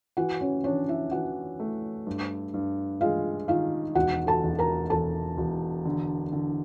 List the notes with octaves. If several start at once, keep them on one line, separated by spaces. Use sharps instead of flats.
E3 F#4 F#5
C#4 C#5
C#4 D4 C#5
E4 E5
E3 F#4 F#5
A3
G2
G2
G#3 F4 F5
D#3 F4 F5
E1 F#4 F#5
A4 A5
E1
A#4 A#5
E1 A4 A5
E1
D3
D3